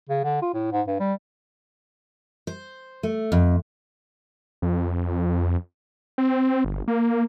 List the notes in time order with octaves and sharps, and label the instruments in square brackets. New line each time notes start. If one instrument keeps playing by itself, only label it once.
[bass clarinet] C#3
D3
F4
A2
G#2
G2
G3
[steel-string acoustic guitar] C5
A3
F2
[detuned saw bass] F2
C4
G1
A#3